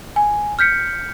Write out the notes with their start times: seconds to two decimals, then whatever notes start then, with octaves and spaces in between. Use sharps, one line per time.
0.16 G#5
0.59 F6 G6 B6 C#7